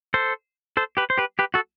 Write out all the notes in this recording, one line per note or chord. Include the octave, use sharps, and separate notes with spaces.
A4 C5
A4 C5
G4 B4
C5
G4 B4
G4 B4
F#4 A4